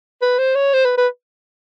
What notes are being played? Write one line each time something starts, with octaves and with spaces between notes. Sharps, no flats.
B4
C5
C#5
C5
B4
B4